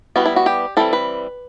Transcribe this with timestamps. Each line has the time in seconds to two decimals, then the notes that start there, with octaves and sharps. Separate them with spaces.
0.16 E3 G3 B3 F#4
0.26 E4
0.36 F#4
0.46 G4
0.77 E3 G3 C4 A4
0.93 B4